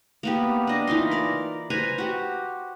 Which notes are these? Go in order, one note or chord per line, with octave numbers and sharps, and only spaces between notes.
A#3 B3 G4
D4 D#5
E3 D#4 F4 C6
A#4 D5
B4 C5 G#5 A#5
F#4 G4